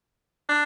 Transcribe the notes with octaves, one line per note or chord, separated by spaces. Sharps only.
D4